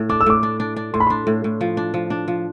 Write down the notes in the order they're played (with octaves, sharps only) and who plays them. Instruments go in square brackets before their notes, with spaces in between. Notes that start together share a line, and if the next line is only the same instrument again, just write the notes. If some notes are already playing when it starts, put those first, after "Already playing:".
Already playing: [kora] A2
[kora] D4 [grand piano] D6
[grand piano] E6
[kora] A2 [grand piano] D6
[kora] D4
D4
D4
[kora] A2 [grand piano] C6
[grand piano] B5
[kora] D4 [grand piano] C6
[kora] A2
A2
F3
D4
F3
D4
F3